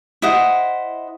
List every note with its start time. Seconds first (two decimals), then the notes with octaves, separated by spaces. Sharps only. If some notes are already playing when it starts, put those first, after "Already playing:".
0.22 E4 C5 D#5 F#5